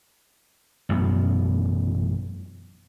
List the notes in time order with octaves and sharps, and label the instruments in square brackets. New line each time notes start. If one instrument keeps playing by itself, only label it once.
[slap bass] A1 F#2 B2 B3